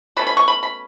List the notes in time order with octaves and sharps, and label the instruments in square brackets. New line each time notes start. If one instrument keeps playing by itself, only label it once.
[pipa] B2 A3 C#4 B5
B5
C#6
B5
B5